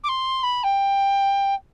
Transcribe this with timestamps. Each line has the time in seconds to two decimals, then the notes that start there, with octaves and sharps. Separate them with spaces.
0.04 D6
0.09 C6
0.43 B5
0.64 G5